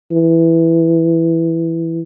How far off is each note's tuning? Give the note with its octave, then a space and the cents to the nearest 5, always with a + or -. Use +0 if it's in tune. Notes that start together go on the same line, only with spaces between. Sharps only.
E3 +0